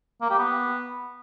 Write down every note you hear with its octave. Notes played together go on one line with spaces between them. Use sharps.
A#3
G4
B3